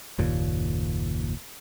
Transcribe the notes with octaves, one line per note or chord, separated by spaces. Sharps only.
F#1 D#2 A#2